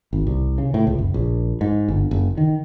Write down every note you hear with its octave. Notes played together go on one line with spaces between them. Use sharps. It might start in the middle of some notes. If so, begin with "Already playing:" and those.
G#1
C2
C#3
A2
C#2
F#1
A#1
G#2
G1
F#1
D#3